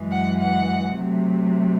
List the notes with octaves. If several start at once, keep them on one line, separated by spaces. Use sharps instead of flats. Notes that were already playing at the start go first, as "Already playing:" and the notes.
Already playing: F#2 E3 G#3
F#5
F#5
C3 F#3 A3